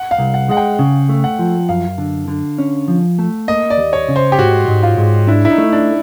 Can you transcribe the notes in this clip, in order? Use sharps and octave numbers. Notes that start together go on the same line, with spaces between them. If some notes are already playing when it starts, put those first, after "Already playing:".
Already playing: F#5
F5
C2
F#5
G#3 F#5
G5
C#3
A3
F#5
F3
F#2 F5
D3
D3
C#4
F3
A3
A#3 D#5
D5
D#2
C#5
C#3
C5
G4
G#2 F#4
G#2
F4
G#2
D4 E4
E4
D#4
A3
D4